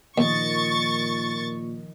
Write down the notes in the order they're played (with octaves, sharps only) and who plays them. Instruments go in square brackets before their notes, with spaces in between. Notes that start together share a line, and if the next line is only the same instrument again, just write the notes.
[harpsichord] D#2 [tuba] A#2 [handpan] D#3 F3 D#5 [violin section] C#6 A6